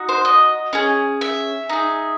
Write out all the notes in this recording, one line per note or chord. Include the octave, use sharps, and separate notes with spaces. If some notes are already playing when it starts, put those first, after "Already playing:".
Already playing: D#4 F#4
C5
D#5
C#4 G#4
E5
D#4 G#4